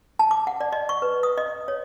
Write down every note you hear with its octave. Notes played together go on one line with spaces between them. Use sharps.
A5
D6
F#5
D5
D#5
C#6
B4
D#6
D#5
C#5